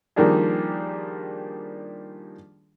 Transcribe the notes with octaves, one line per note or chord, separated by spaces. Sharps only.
D#3 F3 G3 A#3 D4 G#4